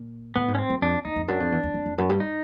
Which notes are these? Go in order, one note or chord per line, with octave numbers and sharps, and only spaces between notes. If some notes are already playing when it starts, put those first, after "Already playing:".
Already playing: A#2
A2 B3
G#2
C#4
C4
F#2
F2 D4
E2 D#4
F2
F#2 D4
F2
E2
E2
F2
F2
F#2
G2
D#4